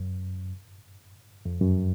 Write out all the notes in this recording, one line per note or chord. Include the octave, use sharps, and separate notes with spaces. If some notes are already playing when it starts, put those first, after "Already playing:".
Already playing: F#2
F2
F#2